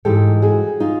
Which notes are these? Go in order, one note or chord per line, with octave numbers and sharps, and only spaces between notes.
G#2 E3 G#3 G4 A4
F#4 G#4
D#4 F4